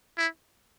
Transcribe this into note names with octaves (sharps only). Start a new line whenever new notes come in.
E4